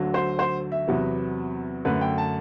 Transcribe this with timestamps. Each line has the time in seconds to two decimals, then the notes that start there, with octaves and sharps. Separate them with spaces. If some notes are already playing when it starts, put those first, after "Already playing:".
Already playing: D2 D3 F#3
0.14 C5
0.39 C5
0.72 E5
0.88 E2 C3 F#3 B3
1.85 F#2 D3 A3 B4
2.01 G5
2.18 A5